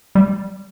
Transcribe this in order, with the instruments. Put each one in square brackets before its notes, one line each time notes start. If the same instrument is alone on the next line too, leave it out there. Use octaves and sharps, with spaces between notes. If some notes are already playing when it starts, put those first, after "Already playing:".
[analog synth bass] G3